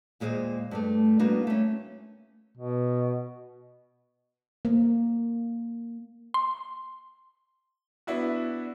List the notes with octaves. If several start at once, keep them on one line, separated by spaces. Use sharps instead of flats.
D#2 A#2 G#3 C5 D#5
G2 G3 A3
G3 A#3 B3 D4 D#4 F#4
A3 C#4
B2
A#3
C6
B3 D4 E4 F#4